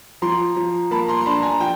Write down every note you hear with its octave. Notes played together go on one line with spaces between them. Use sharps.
F3 A#5 C6
F3
A#3 A5 B5
A#5 C6
C6
D4 A5 B5
G#5 A#5
F3 G5 A5